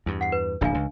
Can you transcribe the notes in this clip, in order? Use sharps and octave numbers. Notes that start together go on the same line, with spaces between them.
E2 G2
F#5 C7
B4
D1 A#1 A#2 D4 F5 G#5
C#2